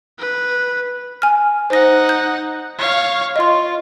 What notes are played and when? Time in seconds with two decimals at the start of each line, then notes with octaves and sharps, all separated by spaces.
0.20 B4
1.22 G#5 F6
1.70 D#4 C5 F#5 A#6
2.09 G6
2.78 C#5 F5
3.36 F4 D#5 C6